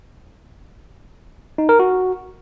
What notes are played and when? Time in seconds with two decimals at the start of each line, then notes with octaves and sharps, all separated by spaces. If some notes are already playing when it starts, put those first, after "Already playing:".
1.58 D#4
1.69 A#4
1.80 F#4